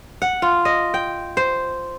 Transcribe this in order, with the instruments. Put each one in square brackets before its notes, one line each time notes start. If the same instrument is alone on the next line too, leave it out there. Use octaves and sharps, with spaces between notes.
[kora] F#5
F4
D#5
G5
C5